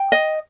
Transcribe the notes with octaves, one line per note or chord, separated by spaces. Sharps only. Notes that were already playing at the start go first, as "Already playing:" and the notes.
Already playing: G5
D#5